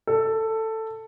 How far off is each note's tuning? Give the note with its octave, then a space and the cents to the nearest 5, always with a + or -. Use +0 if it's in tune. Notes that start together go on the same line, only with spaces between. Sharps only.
A4 +10